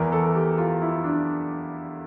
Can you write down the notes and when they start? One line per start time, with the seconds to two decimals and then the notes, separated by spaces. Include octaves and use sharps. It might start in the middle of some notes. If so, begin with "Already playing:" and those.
Already playing: E2 E3 A#4
0.12 A4
0.35 G4
0.58 F4
0.82 E4
1.04 D4